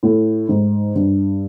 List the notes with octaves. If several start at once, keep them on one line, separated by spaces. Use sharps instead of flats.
A2
G#2
G2